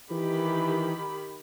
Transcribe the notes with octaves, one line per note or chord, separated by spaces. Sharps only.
D#3 E3 G4 B5